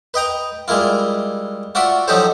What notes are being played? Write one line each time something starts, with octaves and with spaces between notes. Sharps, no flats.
B4 D#5 G5 A#5
G3 G#3 A#3 E4 F4
F4 F#4 D5 E5 F#5
F3 F#3 D#4 G4 A4 C5